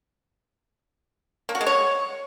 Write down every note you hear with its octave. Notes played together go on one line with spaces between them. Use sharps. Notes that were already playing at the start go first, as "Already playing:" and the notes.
A#3
F#4
G#3
C#5